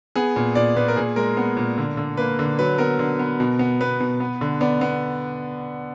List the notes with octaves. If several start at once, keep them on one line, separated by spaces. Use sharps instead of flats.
B3 G#4
A#2
A#2 D5
A#2 B4
A#4
A#2 G#4
G#3 A#4
B3
A#2
D3
D3
A#3 B4
D3
F#3 B4
B3 A#4
D3
B3
B2
B3
B3 B4
B2
B3
D3
B3 D5
B3